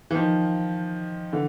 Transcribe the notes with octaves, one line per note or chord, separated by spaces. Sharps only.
E3
D#3 F3
D3 E3